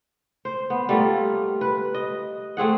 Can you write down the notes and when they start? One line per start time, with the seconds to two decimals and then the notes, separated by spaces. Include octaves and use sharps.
0.45 C5
0.70 B3
0.89 G3 A3 A#3 F4
1.61 B4
1.94 D#5
2.57 A3 C4 G#4 F#5